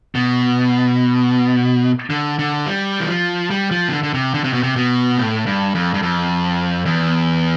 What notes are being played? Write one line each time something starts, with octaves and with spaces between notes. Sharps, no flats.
B2
D3
D3
G3
E3
F3
G3
F3
C3
D3
D3
C3
D3
C3
B2
C3
B2
A2
G2
F2
G2
F2
E2